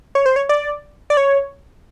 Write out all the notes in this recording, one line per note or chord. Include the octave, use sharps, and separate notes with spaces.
C#5
C5
C#5
D5
D5
C#5